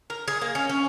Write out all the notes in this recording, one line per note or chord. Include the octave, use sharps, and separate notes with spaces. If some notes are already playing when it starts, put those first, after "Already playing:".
A#4
G#4
A#3
C#4
C#4